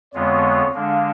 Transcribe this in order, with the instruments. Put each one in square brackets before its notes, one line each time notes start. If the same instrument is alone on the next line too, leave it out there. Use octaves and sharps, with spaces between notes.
[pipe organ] F2 D3 G#3 B3 F4 [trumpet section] C#5
[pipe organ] D3 G#3 D4 [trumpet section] F5